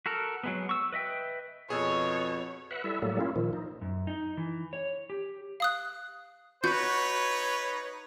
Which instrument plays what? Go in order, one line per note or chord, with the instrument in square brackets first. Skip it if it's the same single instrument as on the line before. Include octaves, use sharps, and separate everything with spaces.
[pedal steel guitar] F#4 A4 A#4
F#3 G#3 B3
C#6 E6
B4 D#5 E5 G5
[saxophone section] F2 B2 [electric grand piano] G#4 E6 [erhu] C#5
[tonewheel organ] B4 E5 F#5
G3 E4 A4 E5
A2 F#3 G3 A#3 A4
A#3 C#4 E4 F4
A#2 D#3 F3
D#4
[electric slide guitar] F#2
D#4
E3
C#5
G4
[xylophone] F5 D#6 F#6
[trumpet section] D#4 B4 C#5 [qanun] F#4 [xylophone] G6